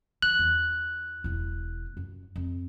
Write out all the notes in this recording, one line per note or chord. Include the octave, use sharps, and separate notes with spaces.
E3 F#6
E2
E1 E4
F#2
F2